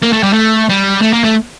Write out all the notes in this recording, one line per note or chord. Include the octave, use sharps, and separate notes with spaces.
A#3
A3
G3
A3
G3
A3
A#3
A3